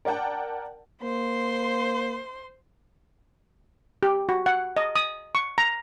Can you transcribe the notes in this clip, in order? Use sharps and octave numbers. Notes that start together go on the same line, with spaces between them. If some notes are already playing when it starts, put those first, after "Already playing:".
A#4 D5 F#5 G5 A5
A#3 C5 C6
G4
F#4
F#5
D#5
D#6
C#6
A#5